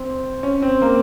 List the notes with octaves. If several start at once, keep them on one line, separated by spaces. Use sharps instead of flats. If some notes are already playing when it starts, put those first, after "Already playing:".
Already playing: C4
C#4
C4
A#3